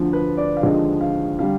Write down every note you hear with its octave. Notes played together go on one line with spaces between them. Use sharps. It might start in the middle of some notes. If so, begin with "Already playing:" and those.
Already playing: D2 D3 F3
B4
D5
F5
D#2 D3 F3 G#3 D#5
F5
D3 G3 F5